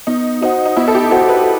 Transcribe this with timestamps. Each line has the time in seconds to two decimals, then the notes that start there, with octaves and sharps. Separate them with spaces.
0.07 B3 D#4
0.41 D#4 F#4 C5 F#5
0.66 D#4
0.77 B3 E4
0.88 A4
0.95 G4
1.11 F#4 A4 C5 F#5
1.29 B4